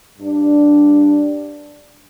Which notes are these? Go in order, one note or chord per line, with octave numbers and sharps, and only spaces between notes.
G2 G3 D4